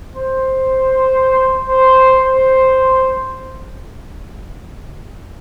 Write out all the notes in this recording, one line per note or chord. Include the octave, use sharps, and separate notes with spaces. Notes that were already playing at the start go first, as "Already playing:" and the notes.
C5
C5
C5